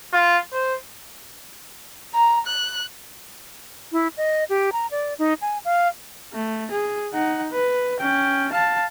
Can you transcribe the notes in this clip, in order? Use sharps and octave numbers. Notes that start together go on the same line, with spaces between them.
F4
C5
A#5
F#6
E4
D#5
G4
A#5
D5
D#4
G#5
F5
A3
G#4
D#4 F#5
B4
C#4 G5
F5 A5